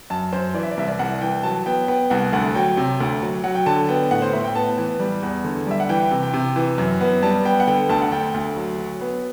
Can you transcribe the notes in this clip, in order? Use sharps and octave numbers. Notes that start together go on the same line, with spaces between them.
F#2 A5
F#2 C5
E3 D5
E5
D5
C2 E5
D5
C2 F#5
E3 G5
F#3 A5
B3 G5
B3 G5
C2 F#5
D2 F#5
F#3 G5
C3
D2
F#3
F#3 F#5
G5
D3 A5
B3 G5
A2 F#5
C5
A2 E5
G5
B3 A5
E3
G3
E2
D3
G3 E5
F#5
E3 G5
G5
C3
G5
C3
E3
F#2
B3
G3 A5
B3 G5
F#5
D3 G5
D2 A5
F#5
D2 G5
D2
F#3
F#3
B3